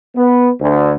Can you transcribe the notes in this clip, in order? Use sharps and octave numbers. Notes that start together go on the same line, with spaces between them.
B3
D2